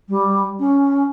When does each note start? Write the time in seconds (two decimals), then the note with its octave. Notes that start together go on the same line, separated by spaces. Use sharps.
0.09 G3
0.59 C#4